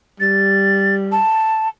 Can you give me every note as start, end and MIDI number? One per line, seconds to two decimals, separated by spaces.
0.20 1.20 55
0.20 0.95 93
1.12 1.68 81